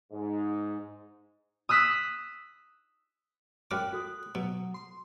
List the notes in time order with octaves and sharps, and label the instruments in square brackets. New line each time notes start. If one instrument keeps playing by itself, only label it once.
[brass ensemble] G#2
[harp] D#6 E6 F#6 B6
[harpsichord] F#2 D6 [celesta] G5 F6 [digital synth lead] F#6
[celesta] F#4 A4 D#6
[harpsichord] B2 [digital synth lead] F#3
[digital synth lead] C6